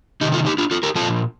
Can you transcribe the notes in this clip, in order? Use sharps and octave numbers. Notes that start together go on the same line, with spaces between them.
C3 D#3 D#4 G4
F4 A4
D#4 G4
D4 F4
F4 A4
G4 A#4
A#2 F3 F4 A4